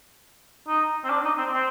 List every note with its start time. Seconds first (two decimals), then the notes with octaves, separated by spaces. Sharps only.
0.68 D#4
1.04 C4
1.10 D4
1.25 D#4
1.38 C4
1.52 C4